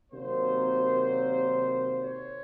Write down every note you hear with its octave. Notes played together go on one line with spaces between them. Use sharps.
C3 D#3 F#3 A#3 C5
C#5